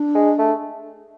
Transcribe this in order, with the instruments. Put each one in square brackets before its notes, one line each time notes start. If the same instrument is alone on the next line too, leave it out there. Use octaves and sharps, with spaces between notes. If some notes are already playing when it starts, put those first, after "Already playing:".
Already playing: [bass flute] D4
[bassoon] G#3
A3